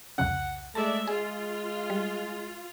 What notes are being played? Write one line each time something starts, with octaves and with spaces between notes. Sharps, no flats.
C2 F2 C#3 F#5
G#3 A3 D5 E5 A5
G#3 F4 G#4
G3